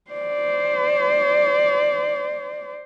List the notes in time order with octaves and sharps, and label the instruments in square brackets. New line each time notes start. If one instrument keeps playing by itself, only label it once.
[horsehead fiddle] C5 D5